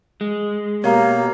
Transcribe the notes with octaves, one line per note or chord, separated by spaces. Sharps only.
G#3
B2 A#3 G4 C#5 F5 A#5